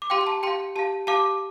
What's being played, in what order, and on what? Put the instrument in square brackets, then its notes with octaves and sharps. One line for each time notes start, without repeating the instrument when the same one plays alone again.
[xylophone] D6
G4 F5 G5 C6
C6
A5
G4 F5 G5 C6
G4 F5 A5
G4 F5 A5 D6